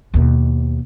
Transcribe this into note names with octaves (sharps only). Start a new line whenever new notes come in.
D#2 B2